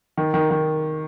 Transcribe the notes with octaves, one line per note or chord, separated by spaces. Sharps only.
D#3
D#3
D#3